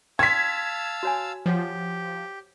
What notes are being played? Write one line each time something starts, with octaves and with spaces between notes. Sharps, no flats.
F5 G5 A5 C6 E6 G#6 B6
F#4 C#5 G#5
F3 G4 C5 C#5 F#5